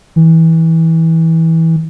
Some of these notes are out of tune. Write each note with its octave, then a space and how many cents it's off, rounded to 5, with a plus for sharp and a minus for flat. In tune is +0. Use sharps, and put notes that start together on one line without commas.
E3 -20